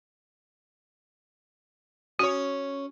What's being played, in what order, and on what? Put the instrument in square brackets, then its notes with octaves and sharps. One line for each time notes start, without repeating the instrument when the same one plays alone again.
[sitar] C#4 C#5 [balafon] F#4